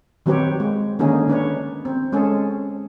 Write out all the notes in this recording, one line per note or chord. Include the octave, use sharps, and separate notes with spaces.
D#3 F#3 C4 G4 B4 C#5
G#3
D3 D#3 A#3 C#4 D#4 G#4
D#3 D4 B4 C#5
C4
G#3 C#4 G#4 A4